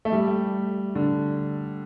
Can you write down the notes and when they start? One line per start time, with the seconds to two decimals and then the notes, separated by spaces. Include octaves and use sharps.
0.05 A3
0.12 G3
0.95 D3